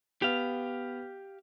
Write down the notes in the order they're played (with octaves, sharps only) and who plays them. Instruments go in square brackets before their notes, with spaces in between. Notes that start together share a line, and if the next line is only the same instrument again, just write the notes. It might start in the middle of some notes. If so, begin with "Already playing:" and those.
[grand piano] B3 [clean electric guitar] G4 F5